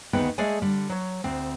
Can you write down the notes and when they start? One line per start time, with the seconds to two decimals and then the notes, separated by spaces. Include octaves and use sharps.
0.13 D2 D#3 B3 D#4 G#4 G5
0.38 G#3 A3 G#4 D5 G#5
0.62 D3 G3
0.89 F#3 C#5
1.24 D2 C4